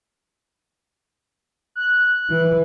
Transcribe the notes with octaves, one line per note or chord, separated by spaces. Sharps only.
F#6
E3